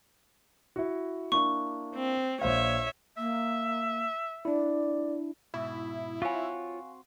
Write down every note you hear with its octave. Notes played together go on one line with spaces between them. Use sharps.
E4 F#4
A#3 D4 E4 C#6
C4
A#1 C5 C#5 E5 F5
A#3 E5
D4 E4 D5
G#2 B2 E4
C4 F4 F#4 C#5 F5 G#5